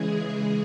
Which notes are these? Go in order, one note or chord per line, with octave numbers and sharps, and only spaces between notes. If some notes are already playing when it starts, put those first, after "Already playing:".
Already playing: C#3 E3 G#3 G#4